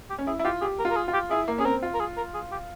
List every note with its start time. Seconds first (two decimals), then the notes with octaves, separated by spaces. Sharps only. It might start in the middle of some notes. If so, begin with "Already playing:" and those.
0.10 G4
0.19 C#4
0.27 E4 G#4
0.39 E4
0.44 F4 G4
0.61 G4 G#4
0.79 A#4
0.85 F4
0.90 A#4
0.96 G#4
1.08 F4
1.13 G4
1.31 E4 G#4
1.48 A#3
1.58 C#4 G#4
1.65 C4 A#4
1.83 F4
1.94 A#4
2.00 G#4
2.17 A#4
2.34 G#4
2.51 G4